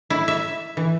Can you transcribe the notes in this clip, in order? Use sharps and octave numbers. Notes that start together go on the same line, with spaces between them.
E4
E5
E3